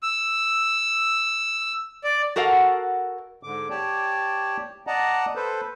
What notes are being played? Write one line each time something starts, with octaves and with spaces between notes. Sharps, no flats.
E6
D5
F#4 A4 A#4 D#5 F5 F#5
G#2 D3 D6
G4 C#5 D5 G5 A5
D5 D#5 F#5 A5 A#5
A4 B4 C5